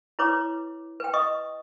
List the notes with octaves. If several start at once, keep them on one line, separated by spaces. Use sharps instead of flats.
E4 B4 C#5 D6
B4 G5
D#5 C#6 D#6